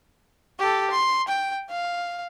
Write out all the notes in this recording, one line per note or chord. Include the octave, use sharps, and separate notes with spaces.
G4 A4
C6
G5
F5